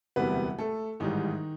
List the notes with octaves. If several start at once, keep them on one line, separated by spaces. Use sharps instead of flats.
E1 D2 C3 E3 G3 B3 B4
A3 A4
A1 G#2 D#3 E3 G3 D#4